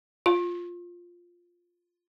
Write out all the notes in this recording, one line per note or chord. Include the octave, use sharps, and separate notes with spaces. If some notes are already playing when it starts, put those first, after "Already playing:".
F4